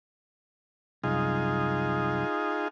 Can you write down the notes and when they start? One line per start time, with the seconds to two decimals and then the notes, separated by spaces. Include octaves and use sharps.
1.04 C2 F#2 D#4 F4 G#4 F5